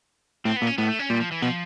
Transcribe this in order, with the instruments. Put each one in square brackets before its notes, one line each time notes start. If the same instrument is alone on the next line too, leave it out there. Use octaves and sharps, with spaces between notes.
[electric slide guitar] A2 [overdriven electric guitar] C4
[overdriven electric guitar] B3
[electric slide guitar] A#2
[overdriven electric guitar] C#4
[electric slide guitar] A2 [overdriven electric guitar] B3
[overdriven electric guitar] A3
C#4
[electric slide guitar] A#2 [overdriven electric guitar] G3
[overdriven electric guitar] F3
E3
[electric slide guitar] B2 [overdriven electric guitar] F3